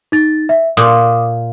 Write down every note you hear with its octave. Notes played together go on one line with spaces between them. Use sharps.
D#4 A6
E5
A#2 D6 D#6